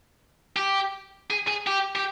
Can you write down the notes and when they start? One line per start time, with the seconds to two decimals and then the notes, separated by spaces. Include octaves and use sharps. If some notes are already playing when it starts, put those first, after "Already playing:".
0.56 G4
1.30 G#4
1.47 G#4
1.67 G4
1.95 G4